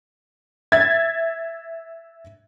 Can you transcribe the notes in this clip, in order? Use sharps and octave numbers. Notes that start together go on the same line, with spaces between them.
E5 G#6 A6